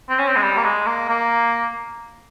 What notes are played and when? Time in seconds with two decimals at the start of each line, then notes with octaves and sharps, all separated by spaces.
0.09 C4
0.18 C#4
0.27 C4
0.36 G#3
0.42 G3
0.57 A#3
0.64 G#3
0.86 A#3
1.09 A#3